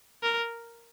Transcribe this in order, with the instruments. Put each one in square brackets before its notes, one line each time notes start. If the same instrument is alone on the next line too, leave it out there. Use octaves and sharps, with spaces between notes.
[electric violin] A#4